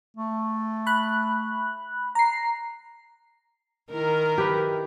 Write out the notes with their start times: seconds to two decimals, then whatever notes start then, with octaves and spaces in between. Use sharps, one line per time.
0.17 A3
0.86 B5 F#6
2.15 A#5 C7
3.92 D#3 E4 A#4
4.38 G4 B4